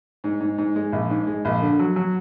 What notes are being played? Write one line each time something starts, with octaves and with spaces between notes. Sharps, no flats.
G#2
G#2
G#2
G#3
A#1
G#2
G#3
A#1
D3
F#3
F#3